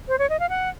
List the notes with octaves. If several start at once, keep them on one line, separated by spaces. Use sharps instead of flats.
C5
C#5
D#5
F5
F#5